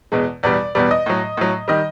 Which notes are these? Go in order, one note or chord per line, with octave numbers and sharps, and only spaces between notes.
E2 B2 G#3
E2 B2 G3 D5
E2 B2 G3 D5
D#5
A2 F#3
A2 F#3
D#3 G3 D#5